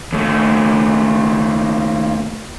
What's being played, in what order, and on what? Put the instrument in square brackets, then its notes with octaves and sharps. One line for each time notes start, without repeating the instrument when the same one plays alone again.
[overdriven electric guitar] D#2 A3